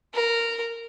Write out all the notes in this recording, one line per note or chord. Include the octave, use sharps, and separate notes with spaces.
A#4